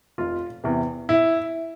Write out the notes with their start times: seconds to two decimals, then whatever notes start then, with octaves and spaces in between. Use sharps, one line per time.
0.18 F1 F4
0.64 E2 C3
1.09 E4